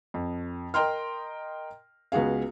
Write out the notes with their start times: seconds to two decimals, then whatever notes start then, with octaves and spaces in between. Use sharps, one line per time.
0.14 F2
0.74 A#4 D#5 G5 A#5 C6 F6
2.12 C#2 B3 F#4 G#4 F5